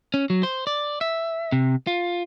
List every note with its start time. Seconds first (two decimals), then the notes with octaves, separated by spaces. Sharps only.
0.14 C#4
0.30 F#3
0.43 C5
0.67 D5
1.01 E5
1.52 C3
1.87 F4